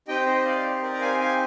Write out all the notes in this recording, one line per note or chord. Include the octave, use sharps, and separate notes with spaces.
C4 D#4 G4 D#5 G5
C5 D#5
D5 F5
A#4 D5
A#5
F5 G#5
F5 G#5